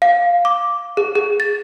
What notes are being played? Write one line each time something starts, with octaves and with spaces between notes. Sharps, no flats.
F5
D6
G#4
G#4
A6